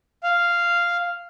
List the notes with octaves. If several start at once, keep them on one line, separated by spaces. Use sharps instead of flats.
F5